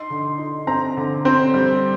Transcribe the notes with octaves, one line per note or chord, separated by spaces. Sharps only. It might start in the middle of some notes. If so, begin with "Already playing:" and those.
Already playing: D#4 C6
D3
D#4
C4 A#5
D3
C4
G3